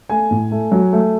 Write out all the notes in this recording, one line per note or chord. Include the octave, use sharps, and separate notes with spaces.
A3 G#5
A2
A3
F#3
A3